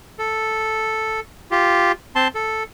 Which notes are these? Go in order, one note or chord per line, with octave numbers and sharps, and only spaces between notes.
A4
F4 G4
C4 A5 C6
A4